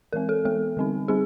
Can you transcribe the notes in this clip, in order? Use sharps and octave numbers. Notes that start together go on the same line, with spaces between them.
E3 G#3 C4 A#4
A4
E3 G#3 B3 A4
D3 G3 C4 D#4
G3 C4 D#4 G#4